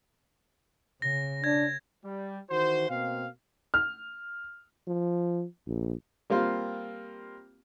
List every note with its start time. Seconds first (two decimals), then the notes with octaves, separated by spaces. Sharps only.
1.02 C#3 A#6
1.44 D4 G#6
2.04 G3
2.50 D#3 E3 F#4 C5
2.89 B2 A#3 C4 F5
3.74 F6
4.87 F3
5.67 A#1
6.30 G3 A#3 C4 F4